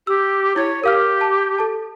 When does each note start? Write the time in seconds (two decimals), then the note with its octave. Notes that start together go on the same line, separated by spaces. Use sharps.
0.07 G4 E6
0.56 E4 C#5 G#6
0.84 G4 A#4 F5 F6
1.21 A5
1.58 A4 A5